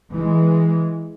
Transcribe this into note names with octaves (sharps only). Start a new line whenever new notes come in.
E3 G#3